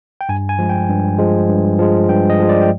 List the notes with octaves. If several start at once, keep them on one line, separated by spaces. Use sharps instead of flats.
G5
G2 G#5
G#5
F3 G#3
G5
G2
F3 G#3
G2
F3 G#3
G2 G5
D#5
F3 G#3
D5
G5